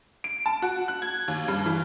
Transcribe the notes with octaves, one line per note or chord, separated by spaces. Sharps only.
D7
A5
F#4
F#6
G#6
D#2
G2
E3